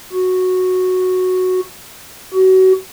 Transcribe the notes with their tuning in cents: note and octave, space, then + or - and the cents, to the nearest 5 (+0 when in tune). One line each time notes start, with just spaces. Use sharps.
F#4 -5
F#4 +30